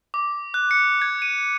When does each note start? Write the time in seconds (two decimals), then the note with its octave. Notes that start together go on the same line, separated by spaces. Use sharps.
0.14 D6
0.54 F#6
0.71 C#7
1.02 G#6
1.22 D#7